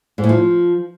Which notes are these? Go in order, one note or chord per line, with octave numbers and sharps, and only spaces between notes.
G#2
A2
F3